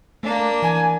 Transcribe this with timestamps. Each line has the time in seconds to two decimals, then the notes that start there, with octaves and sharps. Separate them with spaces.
0.23 A3 A#3 D4
0.62 E3 G#5